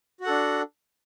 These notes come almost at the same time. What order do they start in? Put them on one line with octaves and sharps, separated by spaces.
F#4 F#5 A4 D4